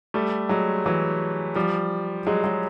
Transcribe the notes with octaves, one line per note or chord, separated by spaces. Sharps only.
G3 A3
F#3 G#3
E3 F#3
F3 G3
F#3 G#3
F#3 G#3